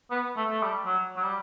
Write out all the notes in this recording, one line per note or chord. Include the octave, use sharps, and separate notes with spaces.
B3
A3
A3
G3
F#3
F#3
G3